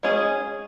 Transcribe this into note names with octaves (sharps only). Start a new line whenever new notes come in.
G#3 C#4 G#4